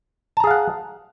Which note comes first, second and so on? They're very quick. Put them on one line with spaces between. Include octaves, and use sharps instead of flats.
A5 A#5 G#4 F5 F#5